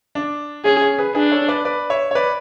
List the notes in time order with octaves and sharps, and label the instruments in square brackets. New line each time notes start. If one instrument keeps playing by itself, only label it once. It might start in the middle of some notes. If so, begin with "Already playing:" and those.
[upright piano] D4
[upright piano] C#4 [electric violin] G#4
[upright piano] C#4
G#4 B4
[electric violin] D4 [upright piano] G#4 B4
[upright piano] A4 C#5
B4 D5
B4 D5
C#5 E5
C#5
B4 D5